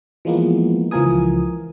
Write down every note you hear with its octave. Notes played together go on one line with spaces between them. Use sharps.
E3 F3 G#3 A#3 B3
C#2 E3 F3 A#4 G#5 D#6